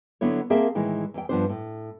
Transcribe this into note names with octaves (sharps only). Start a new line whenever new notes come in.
D3 F#3 B3 E4 C#5
A#3 C4 G#4 A#4 E5 A5
A2 D#3 E3 G#3
E2 G5
G2 F3 B3 C#4 D4 C5
A2